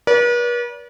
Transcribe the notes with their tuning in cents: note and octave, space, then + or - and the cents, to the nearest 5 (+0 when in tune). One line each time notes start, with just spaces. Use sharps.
B4 -45 D5 -35